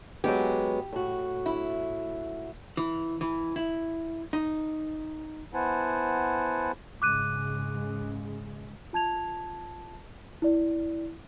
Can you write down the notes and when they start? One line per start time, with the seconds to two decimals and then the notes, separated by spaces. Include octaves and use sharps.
0.24 F#3 G#3 B3 G4
0.93 A2 F#4
1.46 E4
2.77 E3
3.21 E3
3.56 E4
4.33 D#4
5.54 B3 E4 C5 F#5 G#5 A5
7.02 G#2 C#3 G#3 D6 F#6 D#7
8.93 F4 A5 G#6 F7
10.42 E4 D5